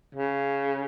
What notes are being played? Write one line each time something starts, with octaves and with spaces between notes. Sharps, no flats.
C#3